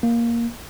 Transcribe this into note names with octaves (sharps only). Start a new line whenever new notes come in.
A#3